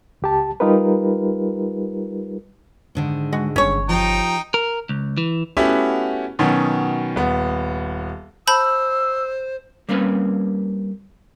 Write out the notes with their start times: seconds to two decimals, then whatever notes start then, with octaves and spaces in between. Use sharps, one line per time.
0.22 C#2 G4 A5
0.60 G3 D#4 F4 G4 A#4 B4
2.95 G#2 D3 D#3
3.33 G#3 F#4
3.56 G1 C#4 C#5
3.89 F3 D#4 G4 G5 A#5
4.54 A#4
4.89 C#2
5.17 E3
5.57 A3 B3 C#4 E4 F#4 G4
6.39 B2 D#3 F#3 B3 C#4
7.16 D#1 B3
8.47 C5 A5 B5 E6 G6
9.89 G3 A#3 C4 C#4 B4